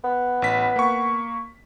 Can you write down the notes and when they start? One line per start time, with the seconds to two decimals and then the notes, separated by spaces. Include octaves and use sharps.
0.04 B3
0.42 A1 B6
0.76 A#3 C#6